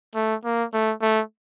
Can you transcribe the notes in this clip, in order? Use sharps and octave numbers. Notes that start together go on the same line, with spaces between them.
A3
A#3
A3
A3